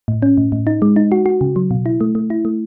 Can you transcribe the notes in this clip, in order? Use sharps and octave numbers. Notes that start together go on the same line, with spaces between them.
A2
C#4
A2
A2
D#4
G#3
D#4
F#4
F#4
C#3
F#3
B2
E4
A3
A3
E4
A3